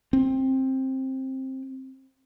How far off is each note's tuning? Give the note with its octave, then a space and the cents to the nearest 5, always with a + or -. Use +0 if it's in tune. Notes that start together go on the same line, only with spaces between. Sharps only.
C4 +15